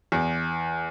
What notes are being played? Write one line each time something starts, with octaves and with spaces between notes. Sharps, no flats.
E2